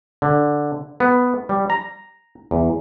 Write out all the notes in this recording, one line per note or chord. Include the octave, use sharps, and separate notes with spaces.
D3
B3
G3
A#5
E2